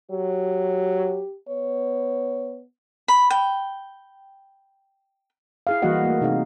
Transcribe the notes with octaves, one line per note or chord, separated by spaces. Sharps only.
F#3 G4
B3 C#5
B5
G5
E4 G#4 F5
E3 G3 A#3 F#4 D#5 F#5
A3 A#3
C3 D#4 G#4 F5